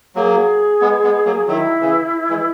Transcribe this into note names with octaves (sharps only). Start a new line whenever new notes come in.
F#3 A#3 G#4
G#3 B3
G#3 B3
F#3 A#3
D#3 F#3 E4
C#3 E3
E3 G#3